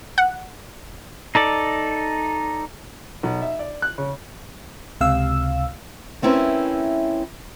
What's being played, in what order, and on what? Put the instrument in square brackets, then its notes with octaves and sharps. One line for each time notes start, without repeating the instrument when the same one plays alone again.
[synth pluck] F#5
[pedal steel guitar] D#4 A4 D5
[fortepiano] B1
E5
D5
F#6
C#3
[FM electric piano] C#2 C3 F5 E6
[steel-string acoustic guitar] A3 C4 C#4 E4 A#4 B4